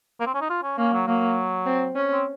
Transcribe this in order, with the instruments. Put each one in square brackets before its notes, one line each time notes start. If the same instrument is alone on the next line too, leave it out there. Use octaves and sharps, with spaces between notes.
[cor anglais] A#3
C4
C#4
D#4
F4
C#4
[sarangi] A#3 [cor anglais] C#4
[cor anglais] F#3
[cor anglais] F#3 [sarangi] A#3
[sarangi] C4
C#4
[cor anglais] C4